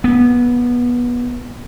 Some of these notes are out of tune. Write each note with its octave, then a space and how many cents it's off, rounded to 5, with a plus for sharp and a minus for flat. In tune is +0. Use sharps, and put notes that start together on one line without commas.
B3 -20